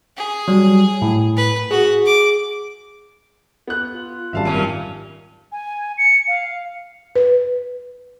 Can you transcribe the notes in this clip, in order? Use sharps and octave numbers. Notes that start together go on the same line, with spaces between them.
G#4
F#3 G3
A2
B4
F#4 G#4
D6
B3 F#6
F4
G#1 F#2 G3 E5 F5 A5
D#2 A#2 C#4
G#5
C#7
F5
B4